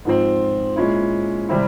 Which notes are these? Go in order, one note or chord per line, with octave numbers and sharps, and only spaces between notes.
G#2 F3 C4
A#2 G#3 C#4 E4
C3 G3 C4 E4